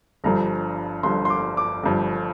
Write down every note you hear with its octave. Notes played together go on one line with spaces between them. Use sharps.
G1 G2 F3 A#5
G1 G2 F3 C6
C6
D6
D6
G1 G2 F3